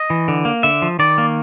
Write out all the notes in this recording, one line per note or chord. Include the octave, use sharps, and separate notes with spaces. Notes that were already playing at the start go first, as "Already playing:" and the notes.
Already playing: D#5
E3
D3
A#3
D3 E5
F3
D#3 D5
A#3